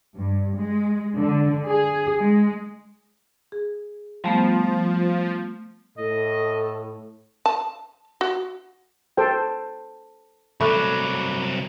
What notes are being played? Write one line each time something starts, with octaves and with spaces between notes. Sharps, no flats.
G2
G#3
D3
G#4
G#3
G#4
F3 G3 A3 B3
A2 A4 D#5
A5
F#4
A4 C5 G5
C2 F#3 A3 B5 D6 F#6